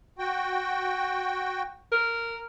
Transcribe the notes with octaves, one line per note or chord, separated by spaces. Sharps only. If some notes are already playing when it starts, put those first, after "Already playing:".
F#4 G5
A#4